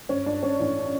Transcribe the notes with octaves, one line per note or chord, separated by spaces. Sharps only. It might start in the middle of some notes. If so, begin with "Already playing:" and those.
G2 C#4
G2 D4
G2 C#4
A1 D4